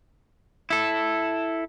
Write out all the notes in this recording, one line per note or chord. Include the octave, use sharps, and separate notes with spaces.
E4 A4